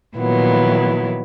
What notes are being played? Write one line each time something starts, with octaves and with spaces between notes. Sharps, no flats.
A#2 D#3 F3 F#3 B3 E4